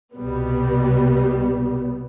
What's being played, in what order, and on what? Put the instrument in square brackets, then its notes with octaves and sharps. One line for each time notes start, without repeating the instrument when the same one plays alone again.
[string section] C2 B2 G3 B3